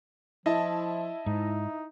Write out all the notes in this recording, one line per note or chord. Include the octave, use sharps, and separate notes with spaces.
F3 E4 D#5 A5
G#2 D#4